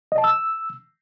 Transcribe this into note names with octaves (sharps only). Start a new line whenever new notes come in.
D#5
A5
E6